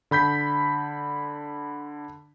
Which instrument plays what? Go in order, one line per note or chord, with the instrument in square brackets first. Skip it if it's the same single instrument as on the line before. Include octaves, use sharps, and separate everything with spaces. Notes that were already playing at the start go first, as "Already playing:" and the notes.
[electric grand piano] D3 B5 G6 B6